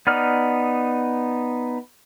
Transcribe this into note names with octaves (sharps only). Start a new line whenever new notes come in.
B3 D#4 D5 F6